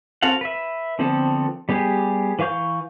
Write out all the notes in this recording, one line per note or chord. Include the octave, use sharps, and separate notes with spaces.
C4 F#4 A4 F5 F#5
B4 E5
D3 F3 B3 C4 A4
G3 B3 G4 G#4
E3 B4 F5 C#6 G6